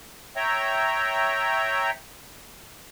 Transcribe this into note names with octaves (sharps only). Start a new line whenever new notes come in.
C#5 E5 G5 A#5